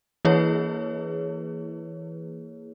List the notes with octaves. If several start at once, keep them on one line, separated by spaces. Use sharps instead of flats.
E3 A#3 E4 G#4 B4 C#5